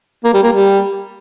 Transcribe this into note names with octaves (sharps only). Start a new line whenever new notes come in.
A#3
G3
A#3
G3